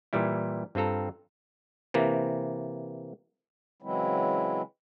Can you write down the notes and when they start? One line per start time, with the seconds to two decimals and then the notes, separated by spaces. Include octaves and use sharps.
0.13 A#2 E3 G3 E4
0.75 G2 C4 F4 A4 A#5
1.94 C3 E3 A#3
3.82 C#3 E3 F#3 G#3 C4 E4